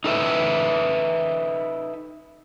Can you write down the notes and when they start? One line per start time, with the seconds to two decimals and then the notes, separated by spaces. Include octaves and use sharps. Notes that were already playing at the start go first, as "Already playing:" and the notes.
0.04 D#4 A4 B4 E5